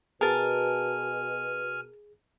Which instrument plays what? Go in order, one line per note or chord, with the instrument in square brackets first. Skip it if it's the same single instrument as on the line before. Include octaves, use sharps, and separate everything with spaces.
[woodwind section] B2 [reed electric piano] G#4 [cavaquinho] A#4 A5 [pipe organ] G#5 F6